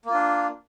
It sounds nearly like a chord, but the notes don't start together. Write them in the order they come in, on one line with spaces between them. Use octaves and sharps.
A#3 F4 D4